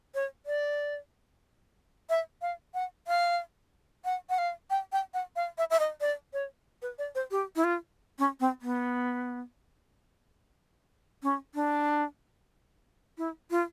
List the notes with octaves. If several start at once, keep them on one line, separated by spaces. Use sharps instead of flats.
C#5
D5
E5
F5
F#5
F5
F#5
F#5
F5
G5
G5
F#5
F5
E5
E5
D#5
D5
C#5
B4
D5
C5
G4
E4
F4
C#4
C4
B3
C#4
D4
E4
F4